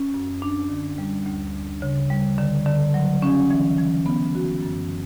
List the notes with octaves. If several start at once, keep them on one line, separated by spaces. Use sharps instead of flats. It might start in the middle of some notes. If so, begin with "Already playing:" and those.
Already playing: C#4
F#2
D4
D3
G3
D2
D4
C#3
G3
D3
D3
F#3
C#4
E3
E3
B3
F#4
F#2